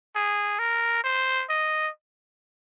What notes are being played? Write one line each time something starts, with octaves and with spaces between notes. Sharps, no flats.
G#4
A#4
C5
D#5